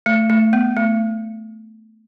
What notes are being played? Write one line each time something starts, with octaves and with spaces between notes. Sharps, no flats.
A3
A3
B3
A3